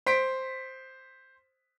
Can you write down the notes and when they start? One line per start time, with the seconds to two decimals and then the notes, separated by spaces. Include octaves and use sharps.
0.06 C5 B6 D7